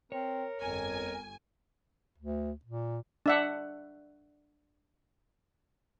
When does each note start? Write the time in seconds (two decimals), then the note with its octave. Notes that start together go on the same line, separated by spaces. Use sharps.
0.12 C4 A#4 C#5
0.60 G1 F2 A#4 G#5
2.18 D2
2.65 A#2
3.26 D4 E5 F#5